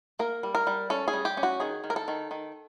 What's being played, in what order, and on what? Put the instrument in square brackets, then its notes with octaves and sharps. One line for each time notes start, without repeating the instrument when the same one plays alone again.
[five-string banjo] A#3 A#4
G3
A#4
G3
C#4 A4
G#4
G3
G4
C#4
F#4
D#3 G#4
D#3
A#4
A4
D#3
D#3